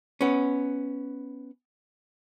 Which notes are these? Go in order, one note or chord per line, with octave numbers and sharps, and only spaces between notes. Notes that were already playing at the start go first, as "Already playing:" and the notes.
B3 C#4